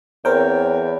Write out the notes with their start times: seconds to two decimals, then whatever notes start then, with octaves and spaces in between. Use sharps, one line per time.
0.25 E2 C4 A#4 C#5 G5